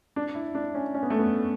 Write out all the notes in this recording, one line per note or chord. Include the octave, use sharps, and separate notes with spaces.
D4
E4
D4
C#4
C#4
B3
A3
B3